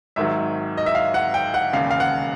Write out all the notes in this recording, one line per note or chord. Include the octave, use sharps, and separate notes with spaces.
G#1 G#2 D#3 F#3 E5
D#5
E5
F5
F#5
G5
F#5
E1 D#2 C#3 F5
F5
F#5